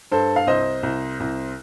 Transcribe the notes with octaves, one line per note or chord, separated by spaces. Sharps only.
G2 A4 C5
F5
C2 C5 D#5
C2
C2